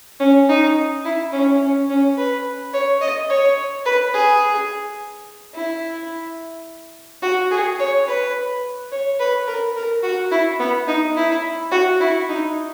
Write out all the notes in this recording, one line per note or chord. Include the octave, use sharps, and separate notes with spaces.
C#4
D#4
E4
C#4
C#4
C#4
B4
C#5
D#5
C#5
B4
G#4
E4
F#4
G#4
C#5
B4
C#5
B4
A#4
A#4
F#4
E4
B3
D#4
E4
F#4
E4
D#4